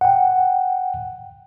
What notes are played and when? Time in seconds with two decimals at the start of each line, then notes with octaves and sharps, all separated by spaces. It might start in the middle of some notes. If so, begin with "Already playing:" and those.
0.01 F#5 G5